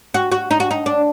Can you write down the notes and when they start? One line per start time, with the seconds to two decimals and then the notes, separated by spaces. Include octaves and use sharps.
0.14 F#4
0.32 F#4
0.51 D#4
0.60 F#4
0.71 D#4
0.86 D4